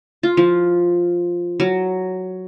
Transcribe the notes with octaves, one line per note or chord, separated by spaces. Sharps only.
F4
F3
F#3